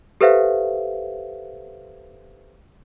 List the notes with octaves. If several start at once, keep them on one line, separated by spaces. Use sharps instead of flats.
G4 A4 B4 C5 E5 F5